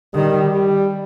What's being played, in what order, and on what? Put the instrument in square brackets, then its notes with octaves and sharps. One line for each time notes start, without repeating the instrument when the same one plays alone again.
[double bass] D#3 [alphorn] G3
[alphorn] G3